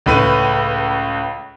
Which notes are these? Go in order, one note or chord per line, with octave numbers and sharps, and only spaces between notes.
C#2 A2 B4 D#7